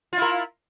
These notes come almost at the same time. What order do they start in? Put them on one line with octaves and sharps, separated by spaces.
F4 E4 A#4